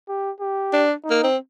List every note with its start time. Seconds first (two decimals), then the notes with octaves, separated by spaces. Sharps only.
0.09 G4
0.41 G4
0.73 D4
1.04 D#4
1.10 A#3
1.24 C4